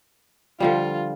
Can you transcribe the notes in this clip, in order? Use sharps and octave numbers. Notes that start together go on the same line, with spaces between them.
D3 F3 G3 F4